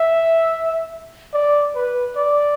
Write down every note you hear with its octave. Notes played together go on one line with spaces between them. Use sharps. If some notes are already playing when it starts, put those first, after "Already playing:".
Already playing: E5
D5
B4
D5